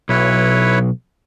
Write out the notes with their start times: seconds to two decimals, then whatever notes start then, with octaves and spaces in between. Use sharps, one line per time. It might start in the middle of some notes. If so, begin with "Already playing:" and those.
0.09 B1 E4 B4 C#5